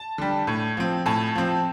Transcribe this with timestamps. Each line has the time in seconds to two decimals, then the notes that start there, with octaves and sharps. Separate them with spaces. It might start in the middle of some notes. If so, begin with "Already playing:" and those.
Already playing: A5
0.18 D3 G3
0.47 A2
0.77 F3 C4
1.06 A2 A5
1.35 F3 C4